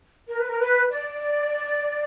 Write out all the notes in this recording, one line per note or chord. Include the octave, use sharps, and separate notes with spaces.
A#4
B4
A#4
B4
D5